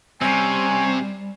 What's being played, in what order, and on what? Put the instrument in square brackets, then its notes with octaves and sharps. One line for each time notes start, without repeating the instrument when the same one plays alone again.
[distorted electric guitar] C3 [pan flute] G3 [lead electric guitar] C4 C#4 [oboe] G#5